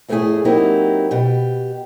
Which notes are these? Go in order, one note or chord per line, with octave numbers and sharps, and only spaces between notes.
F2 A2 A3 D4 E4 G#4
F#3 A#3 C4 D#4 E4 G4
B2 G4